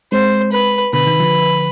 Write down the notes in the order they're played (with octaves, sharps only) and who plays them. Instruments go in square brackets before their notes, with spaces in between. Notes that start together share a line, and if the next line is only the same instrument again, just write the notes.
[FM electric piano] G#3 C4 [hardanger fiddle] C5
[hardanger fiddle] B4
[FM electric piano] B2 D3 [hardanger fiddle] B4
[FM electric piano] C3 D#3
D3 F3